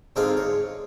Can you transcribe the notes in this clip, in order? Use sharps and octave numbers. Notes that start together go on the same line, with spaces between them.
G#2 D3 C4 D#4 F4 G#4
C#5